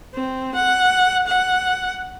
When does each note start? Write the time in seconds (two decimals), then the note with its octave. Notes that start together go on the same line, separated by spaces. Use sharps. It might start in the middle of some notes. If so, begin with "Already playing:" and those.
0.15 C4
0.55 F#5
1.27 F#5